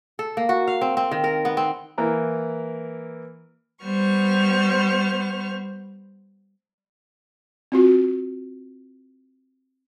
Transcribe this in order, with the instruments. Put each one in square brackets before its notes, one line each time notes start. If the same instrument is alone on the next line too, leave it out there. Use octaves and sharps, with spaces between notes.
[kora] A4
A#3
F#4
F5
C4
C4
D#3
A#4
B3
C4
[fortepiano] E3 A#3 A#5
[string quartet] G3 B3 C5 C#6 F6
[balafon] C4 F4 F#4